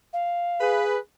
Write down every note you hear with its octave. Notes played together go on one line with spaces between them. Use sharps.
F5
G#4 B4